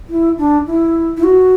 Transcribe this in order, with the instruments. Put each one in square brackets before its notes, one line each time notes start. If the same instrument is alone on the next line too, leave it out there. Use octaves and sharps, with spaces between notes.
[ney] E4
D4
E4
E4
F#4